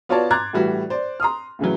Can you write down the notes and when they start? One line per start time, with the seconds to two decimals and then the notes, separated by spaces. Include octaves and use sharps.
0.09 B3 F4 F#4 C#5 D5 A5
0.31 A#5 C6 D6 F#6 G#6 A6
0.53 A2 E3 G3 F#4
0.90 C5 D5
1.20 A#5 C6 D#6 F6
1.59 A2 C#3 E3 F#3